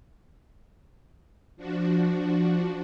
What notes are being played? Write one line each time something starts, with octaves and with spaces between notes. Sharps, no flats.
F3 D4 F#4